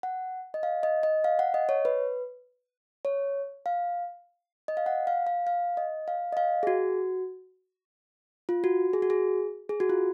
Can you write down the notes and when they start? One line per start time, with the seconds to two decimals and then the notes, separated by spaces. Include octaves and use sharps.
0.03 F#5
0.54 D#5
0.63 F5
0.83 D#5
1.03 D#5
1.24 F5
1.39 F#5
1.54 D#5
1.69 C#5
1.85 B4
3.05 C#5
3.66 F5
4.68 D#5
4.77 F5
4.86 F#5
5.07 F5
5.27 F5
5.47 F5
5.77 D#5
6.08 F5
6.33 D#5
6.37 F5
6.63 G#4
6.67 F#4
8.49 F4
8.64 F#4
8.93 G#4
9.02 F#4
9.10 G#4
9.69 G#4
9.80 F#4
9.90 F4